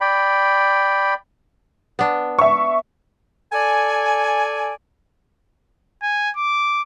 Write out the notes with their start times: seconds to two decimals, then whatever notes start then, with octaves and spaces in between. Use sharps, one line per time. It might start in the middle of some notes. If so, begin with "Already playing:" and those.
0.01 D5 G5 B5
1.99 B3 D4
2.39 E5 C#6
3.52 A4 D5 G#5
6.03 G#5
6.37 D6